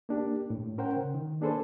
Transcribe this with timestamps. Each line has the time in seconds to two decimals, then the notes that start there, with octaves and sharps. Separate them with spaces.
0.09 A#3 D4 G4
0.50 A2
0.78 C#4 A#4 C5 F#5 G5
0.97 C#3
1.14 D#3
1.41 A#3 D4 G#4 A4 B4 C5